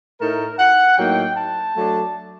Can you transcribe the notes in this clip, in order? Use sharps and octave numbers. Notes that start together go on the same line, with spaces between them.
A2 A3 D#4 A#4
F#5
A2 F#3 A#3 D#4 G5
A5
F#3 A3 D4